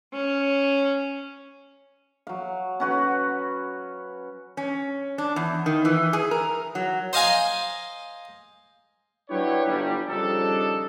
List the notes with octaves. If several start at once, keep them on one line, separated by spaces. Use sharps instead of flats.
C#4
F#3 F5
C#4 F#4 B4
C#4
D4
E2
D#3
E3
G#4
A#4
F#3
C5 D#5 F5 G#5 A#5
F#3 D4 E4 G4 B4 C#5
G1 G3
C#3 F3 G3 D4 D#4 A4